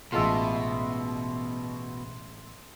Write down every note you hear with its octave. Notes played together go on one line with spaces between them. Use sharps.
A1 B2 G#3 F4 E5 A5 C6